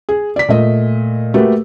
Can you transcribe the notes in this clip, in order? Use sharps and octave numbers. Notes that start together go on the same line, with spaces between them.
G#4
D5 B6
A#2 A3 D#5
A3 A#3 F#4 G4 A4 B4